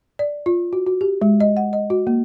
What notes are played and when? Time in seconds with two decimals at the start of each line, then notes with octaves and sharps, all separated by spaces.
0.19 D5
0.46 F4
0.73 F#4
0.87 F#4
1.01 G4
1.22 G#3
1.40 D#5
1.57 F#5
1.73 D#5
1.90 F#4
2.07 A#3